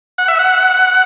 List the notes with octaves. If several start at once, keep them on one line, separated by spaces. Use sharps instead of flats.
F#5
E5
F#5